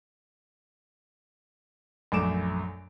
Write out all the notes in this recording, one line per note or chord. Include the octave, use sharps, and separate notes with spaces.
A#1 F#2 A3 D6 D7 E7